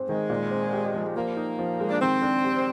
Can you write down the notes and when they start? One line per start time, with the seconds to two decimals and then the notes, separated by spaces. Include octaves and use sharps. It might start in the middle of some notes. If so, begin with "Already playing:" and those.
Already playing: G#2 C4
0.09 D#3 G#3
0.30 A#2
0.51 C4
0.73 G4
0.94 F3
1.16 F3 A#3
1.37 D#4
1.59 F3
1.80 G#3
1.90 D4
2.01 D#3 C4
2.22 D4
2.44 G4